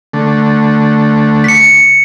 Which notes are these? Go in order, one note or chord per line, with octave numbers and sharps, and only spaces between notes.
D3 A3
B6 C#7